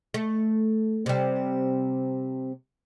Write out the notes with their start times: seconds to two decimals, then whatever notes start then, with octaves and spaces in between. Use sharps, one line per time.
0.14 A3
1.06 C3 G3